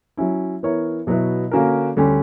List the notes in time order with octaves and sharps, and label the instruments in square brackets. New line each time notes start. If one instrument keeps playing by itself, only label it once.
[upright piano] F#3 C#4 E4
E3 B3 E4 A#4 C#5
B2 F#3 B3 E4 B4
D3 A#3 C#4 F#4 A#4
D2 D3 G3 C#4 G4